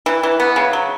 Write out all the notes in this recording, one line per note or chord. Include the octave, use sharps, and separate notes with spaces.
E3
E3
B3
C#3
F#3